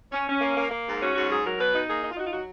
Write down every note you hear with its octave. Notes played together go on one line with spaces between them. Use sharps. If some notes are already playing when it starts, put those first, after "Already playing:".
C#4
C#4
A#3
A#3
A#3
G#2
C#4 F#4
G#2 F#4
F#3 G#4
F#3 A#4
B2 B4
D#4
A#3 G#4
D#4
F4
D#4 F#4
F4
F#3 F#4